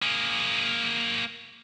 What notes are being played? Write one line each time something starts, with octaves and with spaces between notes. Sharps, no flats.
A#3 G#4